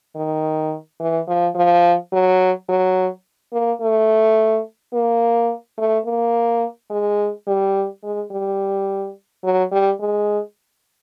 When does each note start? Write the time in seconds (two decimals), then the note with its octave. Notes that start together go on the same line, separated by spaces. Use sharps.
0.15 D#3
1.00 E3
1.28 F3
1.55 F3
2.12 F#3
2.68 F#3
3.52 A#3
3.81 A3
4.93 A#3
5.78 A3
6.06 A#3
6.90 G#3
7.47 G3
8.03 G#3
8.31 G3
9.44 F#3
9.71 G3
10.00 G#3